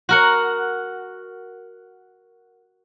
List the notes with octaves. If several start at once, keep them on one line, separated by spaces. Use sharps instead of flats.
F#4 A#4 F#5